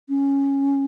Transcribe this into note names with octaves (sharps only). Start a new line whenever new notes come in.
C#4